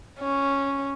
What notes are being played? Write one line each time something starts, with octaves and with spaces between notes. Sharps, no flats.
C#4